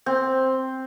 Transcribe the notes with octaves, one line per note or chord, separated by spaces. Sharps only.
C4